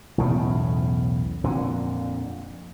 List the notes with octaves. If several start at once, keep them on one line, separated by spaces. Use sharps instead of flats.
B1 E2 A2 C#3
F2 A#2 D3